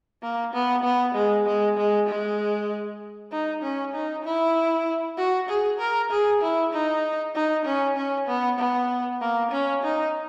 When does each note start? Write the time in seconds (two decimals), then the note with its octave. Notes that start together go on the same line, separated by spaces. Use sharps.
0.23 A#3
0.54 B3
0.84 B3
1.14 G#3
1.47 G#3
1.77 G#3
2.08 G#3
3.32 D#4
3.63 C#4
3.94 D#4
4.24 E4
5.17 F#4
5.49 G#4
5.79 A#4
6.11 G#4
6.42 E4
6.73 D#4
7.35 D#4
7.65 C#4
7.96 C#4
8.27 B3
8.59 B3
9.21 A#3
9.51 C#4
9.83 D#4